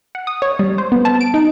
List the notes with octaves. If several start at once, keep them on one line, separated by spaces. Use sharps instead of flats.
F#5
D#6
C#5
G3
C5
B3
A5
D7
D#4